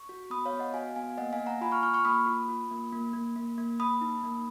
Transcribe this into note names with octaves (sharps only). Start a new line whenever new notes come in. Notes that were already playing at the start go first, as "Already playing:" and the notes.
Already playing: C#6
F#4
B3 B5 D#6
C#5 F5
B3
D#5 F#5
F#4 F5 G#5
B3 F5 G#5
A#3 D#5 F#5
F5 G#5
A#3
F#5 A#5
F4 G#5 B5
C#6 F6
F4 C#6 F6
C#6 F6
A#3 B5 D#6
F4
F4
A#3
A#3
A#3
A#3
A#3
A#3 B5 D#6
D#4
A#3